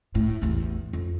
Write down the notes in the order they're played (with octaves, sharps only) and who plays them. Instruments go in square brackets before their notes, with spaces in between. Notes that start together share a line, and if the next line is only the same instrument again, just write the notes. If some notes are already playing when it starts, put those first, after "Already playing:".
[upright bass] A2
A1 E2
F2